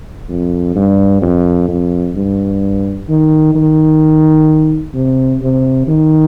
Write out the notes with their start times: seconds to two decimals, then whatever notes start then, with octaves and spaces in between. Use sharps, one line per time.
0.29 F2
0.76 G2
1.22 F2
1.69 F2
2.15 G2
3.09 D#3
3.55 D#3
4.94 C3
5.42 C3
5.87 D#3